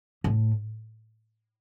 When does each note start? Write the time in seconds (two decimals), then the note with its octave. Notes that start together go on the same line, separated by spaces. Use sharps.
0.24 A2